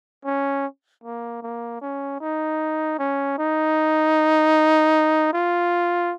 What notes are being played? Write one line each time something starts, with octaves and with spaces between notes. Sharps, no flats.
C#4
A#3
A#3
C#4
D#4
C#4
D#4
F4